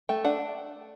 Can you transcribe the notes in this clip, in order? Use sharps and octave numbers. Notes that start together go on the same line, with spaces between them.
A3 G5
D4 F#5